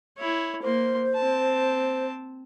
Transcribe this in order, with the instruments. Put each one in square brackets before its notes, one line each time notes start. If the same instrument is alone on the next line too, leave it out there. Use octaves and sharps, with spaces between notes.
[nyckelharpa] E4 C#5
[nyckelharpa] A#3 C6 [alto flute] C5
[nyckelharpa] C4 A5